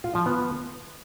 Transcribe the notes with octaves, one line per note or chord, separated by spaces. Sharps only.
F4
F3
B3